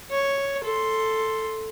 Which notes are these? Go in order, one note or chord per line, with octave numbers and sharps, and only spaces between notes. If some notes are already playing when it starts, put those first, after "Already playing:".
C#5
A4 C6